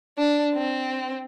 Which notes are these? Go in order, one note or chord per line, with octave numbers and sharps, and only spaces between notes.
D4
C4